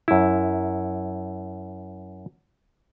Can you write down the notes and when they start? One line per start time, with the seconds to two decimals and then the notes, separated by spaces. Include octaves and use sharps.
0.08 F#2 E4